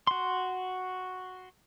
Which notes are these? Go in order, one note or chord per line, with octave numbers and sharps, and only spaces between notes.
F#4 C6